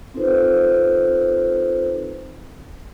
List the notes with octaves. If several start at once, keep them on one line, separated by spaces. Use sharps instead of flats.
C4 D#4 F4 A4 B4 C5